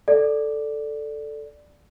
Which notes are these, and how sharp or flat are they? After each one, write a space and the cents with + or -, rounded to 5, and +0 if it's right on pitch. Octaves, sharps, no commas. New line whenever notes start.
A4 +0 D5 +0